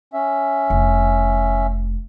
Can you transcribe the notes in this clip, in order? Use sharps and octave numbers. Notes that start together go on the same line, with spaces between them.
C#4 E5
F1